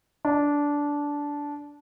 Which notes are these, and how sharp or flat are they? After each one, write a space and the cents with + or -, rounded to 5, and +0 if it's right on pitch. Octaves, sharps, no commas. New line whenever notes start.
D4 -15